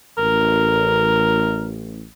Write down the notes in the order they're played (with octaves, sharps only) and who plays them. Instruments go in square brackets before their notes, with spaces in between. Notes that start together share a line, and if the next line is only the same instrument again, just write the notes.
[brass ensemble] A1 [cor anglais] A#4